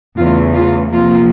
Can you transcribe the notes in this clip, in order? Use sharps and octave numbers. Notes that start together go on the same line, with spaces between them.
E2 C#3 E3 A3 F4
F4
C3 F3 A#3 F4